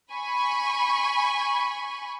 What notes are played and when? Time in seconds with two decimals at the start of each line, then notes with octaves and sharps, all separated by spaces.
0.12 G#5 B5 C#6